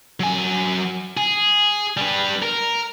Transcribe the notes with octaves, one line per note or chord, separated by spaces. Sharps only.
F#3 G#5
G#4
G3 B4
A#4